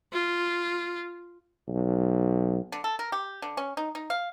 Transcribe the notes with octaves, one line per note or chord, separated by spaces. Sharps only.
F4
B1
D3
A4
A#4
G4
D3
C#4
D#4
D#4
F5